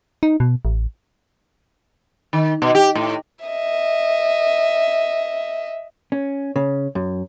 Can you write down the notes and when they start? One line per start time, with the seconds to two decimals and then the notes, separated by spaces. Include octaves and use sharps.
0.23 D#4
0.40 B2
0.65 A1
2.33 D#3
2.62 B2
2.75 G4
2.95 A2
3.45 D#5 E5
6.12 C#4
6.56 C#3
6.95 F#2